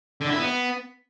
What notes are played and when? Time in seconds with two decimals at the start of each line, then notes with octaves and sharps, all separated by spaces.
0.21 D3
0.30 E4
0.39 B3